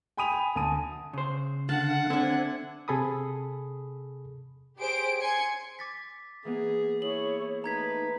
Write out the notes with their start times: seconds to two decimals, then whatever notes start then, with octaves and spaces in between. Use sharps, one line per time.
0.17 G5 G#5 B5 D#6 D#7 F7
0.32 G#5
0.56 D2 G#5 A5 D#6 D#7
1.13 C#3 C5
1.69 D3 F5 F#5 A5 F#6
2.10 D3 C4 D4 A4 E5 G#5
2.88 C3 G#4 A4 B5 D#6
4.77 G4 G#4 C5 D7
5.20 G#5 C6 G#6 C#7
5.79 D6 A6 B6
6.45 E3 A#3 B3 G#4
7.02 E4 G#4 C#5 F#7
7.64 A3 D#4 B4 A#5 G#6 B6